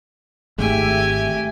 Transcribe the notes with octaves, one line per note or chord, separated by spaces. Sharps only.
G#1 G#3 A3 G4 E5 G#5